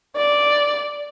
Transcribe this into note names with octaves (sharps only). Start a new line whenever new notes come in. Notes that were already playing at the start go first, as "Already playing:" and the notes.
D5